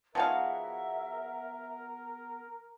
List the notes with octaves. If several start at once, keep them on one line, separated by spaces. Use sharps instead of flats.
F3 B3 D#4 F#4 G#4 A#4 E5 F5